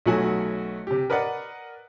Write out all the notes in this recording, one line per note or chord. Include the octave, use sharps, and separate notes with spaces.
B1 F#3 A3 F#4 F#5 G#5
C3 G4
A#4 B4 D5 D#5 F#5